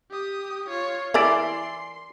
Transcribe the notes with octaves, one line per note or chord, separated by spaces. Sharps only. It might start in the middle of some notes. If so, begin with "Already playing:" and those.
G4 D#6
F4 C#5
E3 E4 A#4 D5 E5 G#5 A#5 C6